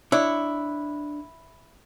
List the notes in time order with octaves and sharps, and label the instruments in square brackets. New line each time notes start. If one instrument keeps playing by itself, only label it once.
[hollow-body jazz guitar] D4 C#5 [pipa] E4